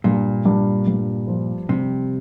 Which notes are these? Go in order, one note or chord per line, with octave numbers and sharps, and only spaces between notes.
G2 A#2
G2
G2
F3
C3 G3